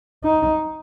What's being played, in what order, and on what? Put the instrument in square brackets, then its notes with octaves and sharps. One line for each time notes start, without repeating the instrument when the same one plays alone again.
[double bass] D#4